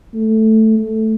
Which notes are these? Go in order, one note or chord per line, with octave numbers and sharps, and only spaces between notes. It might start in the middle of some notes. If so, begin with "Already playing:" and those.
A3
A3